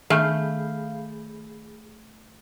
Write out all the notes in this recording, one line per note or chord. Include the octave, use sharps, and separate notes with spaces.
D#3 A3 B3 D4 G#4 F5 B5 G6